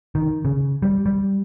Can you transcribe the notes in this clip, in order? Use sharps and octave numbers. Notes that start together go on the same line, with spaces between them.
D#3
C#3
G3
G3